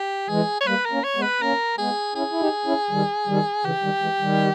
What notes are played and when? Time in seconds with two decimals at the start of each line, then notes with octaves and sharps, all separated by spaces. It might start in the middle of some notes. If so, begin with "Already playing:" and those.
Already playing: G4
0.29 E3 G#3 G#4
0.61 C#5
0.67 G3 A#3 B4
0.86 A#4
0.92 A#3 C#4
1.04 C#5
1.16 G#3 B3
1.22 B4
1.41 A#3 C#4 A#4
1.78 G#3 B3 G#4
2.15 C#4 E4 G#4
2.31 E4
2.41 D#4 G4
2.66 C#4 E4
2.91 D#3 G3
3.28 D#3 G3
3.65 C#3 E3 G4
3.84 D#3 G3
4.02 E3 G#3
4.20 D#3 G3